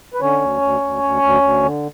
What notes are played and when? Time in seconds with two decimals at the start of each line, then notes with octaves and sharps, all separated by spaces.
0.14 B4
0.20 D3 C#4 C#5
0.41 D2
0.61 D2
0.81 D2
1.02 D2
1.22 D2
1.42 D2
1.63 D3